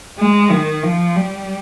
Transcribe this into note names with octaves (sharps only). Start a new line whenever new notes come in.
G#3
D#3
F3
G3